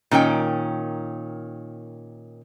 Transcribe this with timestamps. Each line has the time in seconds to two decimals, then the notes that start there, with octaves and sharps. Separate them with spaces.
0.11 A#2 D#3 C#4 G5